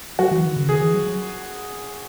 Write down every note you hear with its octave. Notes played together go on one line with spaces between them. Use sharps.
F#3 F#4
E3
D#3
C#3
D#3 G#4
E3
F#3